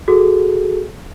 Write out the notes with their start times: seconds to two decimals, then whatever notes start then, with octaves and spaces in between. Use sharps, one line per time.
0.08 F#4 G#4 A4